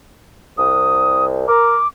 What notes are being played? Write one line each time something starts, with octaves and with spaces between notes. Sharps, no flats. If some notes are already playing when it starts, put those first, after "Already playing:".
C2 D#6
A#4 D6